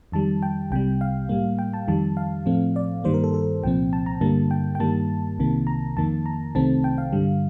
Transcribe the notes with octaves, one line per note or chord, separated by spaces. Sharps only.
F2 D#3 G3 A5
G5
C2 C3 G3 G5
F5
A2 G3 A#3
G5
A5
F2 D#3 G3 A5
F5
A2 F3 A3 C4
D5
G2 D#3 G3 A#3 C5
A#4
A4
A4
C2 A#2 F3 C4 G5
A5
A#5
G2 D3 G3 A#3 A5
G5
G5
G2 D#3 G3 A#3 A5
C2 C3 D#3 A#3
A#5
F2 D#3 A#3 A5
A#5
C2 C3 D#3 A3 C4 A5
G5
F5
G2 D3 G3